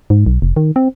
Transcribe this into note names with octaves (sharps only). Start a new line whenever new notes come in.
G#2
B1
F1
D#3
C4